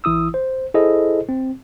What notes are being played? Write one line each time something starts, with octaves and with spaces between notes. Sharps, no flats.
A1 E3 E4 D#6 E6
C5
E4 G#4 A4 C5 D#5
C4